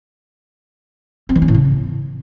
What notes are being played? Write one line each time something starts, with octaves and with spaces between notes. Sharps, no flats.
C4
E3
C#4
A2
C#3